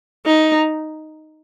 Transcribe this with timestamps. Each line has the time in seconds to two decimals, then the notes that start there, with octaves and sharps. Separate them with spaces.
0.26 D#4